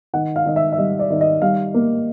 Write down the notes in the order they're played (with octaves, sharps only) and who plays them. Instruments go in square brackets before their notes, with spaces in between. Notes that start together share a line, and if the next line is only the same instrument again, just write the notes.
[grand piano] D#3 F#5
F5
D#3 D#5
E5
E5
G3 D#5
D5
D#3
D#5
G3 F5
A#3